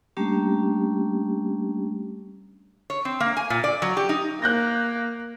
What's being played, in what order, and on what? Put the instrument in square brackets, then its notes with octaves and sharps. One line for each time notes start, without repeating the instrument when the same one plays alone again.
[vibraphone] G3 A3 A#3 C#4 D4 G4
[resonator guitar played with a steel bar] C#5
C4
A#3
G#5
A#2
D5
F#3
G4
D#4
[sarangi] A#3 [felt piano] F#6 G6 A#6